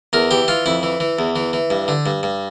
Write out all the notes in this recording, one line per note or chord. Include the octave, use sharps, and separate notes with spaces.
E2 A#4
E3 G4
E3 F4
F2 E4
E3
E3
E2
E3
E3
G2
D3
G2
G2